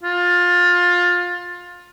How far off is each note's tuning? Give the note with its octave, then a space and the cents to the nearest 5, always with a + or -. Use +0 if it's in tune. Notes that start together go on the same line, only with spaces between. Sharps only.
F4 +20